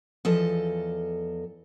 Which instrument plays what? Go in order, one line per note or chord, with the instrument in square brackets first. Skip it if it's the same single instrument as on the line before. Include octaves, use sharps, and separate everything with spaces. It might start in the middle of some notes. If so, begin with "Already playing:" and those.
[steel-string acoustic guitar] E2 F3 A4 D#5